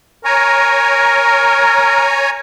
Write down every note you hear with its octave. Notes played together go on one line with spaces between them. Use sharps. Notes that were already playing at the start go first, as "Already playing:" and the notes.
A#4 C#5 G#5 A#5